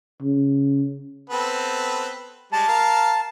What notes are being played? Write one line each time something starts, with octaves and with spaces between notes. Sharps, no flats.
C#3
B3 C4 A4
G3 G#3 A5
A#4 F5